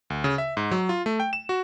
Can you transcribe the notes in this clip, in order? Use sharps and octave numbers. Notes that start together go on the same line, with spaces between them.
D2
C#3
E5
G#2
F#3
F4
A3
G5
E7
F#4